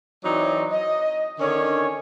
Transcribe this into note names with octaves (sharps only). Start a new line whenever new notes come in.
E3 F#3 C4 D#4 C#5 D5
D#5
D3 D#3 C#4 D4 C#5